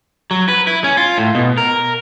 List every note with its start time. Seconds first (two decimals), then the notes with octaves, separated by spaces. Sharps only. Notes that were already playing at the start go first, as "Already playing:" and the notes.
0.31 F#3
0.48 B4
0.67 E4
0.84 C#4
0.97 F4
1.18 A2
1.35 B2
1.58 A#4